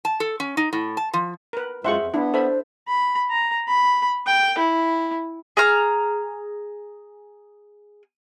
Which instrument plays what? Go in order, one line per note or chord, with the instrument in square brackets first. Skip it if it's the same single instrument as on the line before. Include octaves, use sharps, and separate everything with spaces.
[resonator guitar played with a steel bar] A5
A4
C#4
D#4
A2
A5
F3
[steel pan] A#4 B4
[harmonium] F#2 G#3 F4 [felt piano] G#4 E5 [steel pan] C5 F#5 C#6
[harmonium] F2
[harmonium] B3 [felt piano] D4 [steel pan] E4
[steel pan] A4 E5 B5 [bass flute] C5
[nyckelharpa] B5
A#5
B5
G5
E4
[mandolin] G#4 A#5 F6